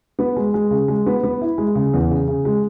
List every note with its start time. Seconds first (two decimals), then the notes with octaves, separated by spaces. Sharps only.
0.19 B3
0.36 G#3
0.54 G#3
0.71 C#3
0.88 G#3
1.06 B3
1.23 B3
1.41 E4
1.58 G#3
1.75 C#3
1.94 E2
2.10 C#3
2.28 C#3
2.45 G#3